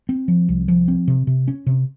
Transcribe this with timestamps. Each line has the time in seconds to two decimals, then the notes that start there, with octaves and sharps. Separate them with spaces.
0.09 C4
0.28 F3
0.49 C2
0.68 F3
0.88 C4
1.08 C3
1.27 C3
1.48 C#4
1.66 C3